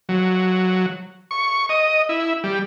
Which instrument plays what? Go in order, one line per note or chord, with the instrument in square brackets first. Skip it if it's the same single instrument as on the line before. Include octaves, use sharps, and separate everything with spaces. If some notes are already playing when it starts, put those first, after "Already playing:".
[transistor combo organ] F#3
C#6
D#5
E4
G3